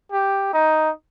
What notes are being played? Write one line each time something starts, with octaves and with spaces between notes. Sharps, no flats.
G4
D#4